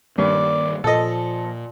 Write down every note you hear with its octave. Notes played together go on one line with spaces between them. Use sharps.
G2 D#3 G3 A#3 D5
A#2 F3 A4 D#5